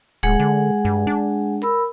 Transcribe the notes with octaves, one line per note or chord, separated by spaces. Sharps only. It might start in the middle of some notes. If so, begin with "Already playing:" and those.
D1 G#3 G#4 F#5
D3
G2
D4
A#4 B5 E6